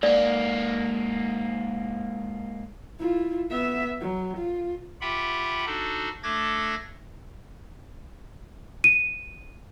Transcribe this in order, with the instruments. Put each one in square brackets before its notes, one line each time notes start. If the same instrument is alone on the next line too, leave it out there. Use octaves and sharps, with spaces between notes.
[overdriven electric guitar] G#2 A#3 [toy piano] D5
[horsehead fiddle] E4 F4
B3 E5
F#3
F4
[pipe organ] F4 G4 E5 F#5 G5 B5
D4 D#4 F#4 A4
A3 D4 A4 D6 G#6 A#6
[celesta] D#7